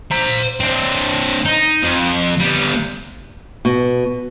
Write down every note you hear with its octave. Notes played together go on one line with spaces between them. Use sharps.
C5 A#5
C4 D4
D#4
F2
G3 B3
B2